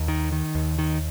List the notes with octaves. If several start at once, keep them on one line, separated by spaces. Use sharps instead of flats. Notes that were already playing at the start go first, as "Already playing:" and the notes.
Already playing: D#2
D#3
D#3
D#2
D#3